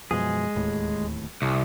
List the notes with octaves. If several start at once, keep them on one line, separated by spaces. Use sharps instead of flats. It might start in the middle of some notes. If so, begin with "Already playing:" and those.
F#2 B2 F3 G#3 G#4
D1 D#2 A2
C2